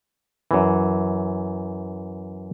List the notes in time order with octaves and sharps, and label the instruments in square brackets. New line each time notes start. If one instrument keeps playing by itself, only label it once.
[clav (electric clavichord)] F#2 E3